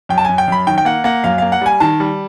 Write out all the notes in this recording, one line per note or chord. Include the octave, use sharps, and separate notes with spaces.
F#2 G5
A5
F#2 G#5
G5
F#2 B5
D#3 G5
G5
A#3 F#5
A#3 F#5
F#2 F5
A#3 F5
F#5
G3 G#5
D#3 A5
G3